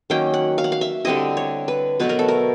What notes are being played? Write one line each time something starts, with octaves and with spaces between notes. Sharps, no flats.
D#3 F#3 A#3 C#4 G5
F#5
F5
F#5
F5
E5
D3 G3 C4 E4 D#5
C#5
B4
B2 F#3 A3 B4
A#4
A4
A#4